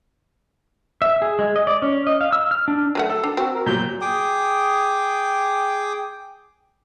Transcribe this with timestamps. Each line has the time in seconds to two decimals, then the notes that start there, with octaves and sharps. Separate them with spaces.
1.02 E5
1.22 G#4
1.39 G#3
1.56 D#5
1.67 D5
1.82 C#4
2.07 D#5
2.21 F5
2.32 E6
2.51 F6
2.68 D4
2.95 F#3 A3 F#5
3.10 A4
3.24 D4
3.37 C4 F#4
3.55 A#4
3.66 A#2 F#3 G6
4.01 G#4 G5 D6 D#6